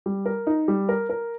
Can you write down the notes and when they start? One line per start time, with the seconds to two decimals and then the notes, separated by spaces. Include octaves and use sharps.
0.06 G3
0.26 A#4
0.47 D#4
0.68 G3
0.89 A#4
1.10 A#4